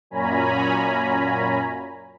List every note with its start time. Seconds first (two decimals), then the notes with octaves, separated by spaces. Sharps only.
0.10 F#2 A#2 C#4 G#5 A#5 B5